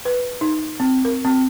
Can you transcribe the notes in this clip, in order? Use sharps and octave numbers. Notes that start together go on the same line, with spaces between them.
B4
D#4
C4
A#4
C4